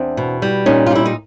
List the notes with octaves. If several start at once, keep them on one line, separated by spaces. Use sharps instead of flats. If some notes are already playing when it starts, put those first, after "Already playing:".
Already playing: E2 C4 D4
B2
G3
A#2 C#4 D#4
F4
G3 E4
D#4